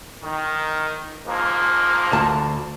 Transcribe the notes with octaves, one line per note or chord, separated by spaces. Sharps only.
D#3
G#2 F3 A#3
D2 A5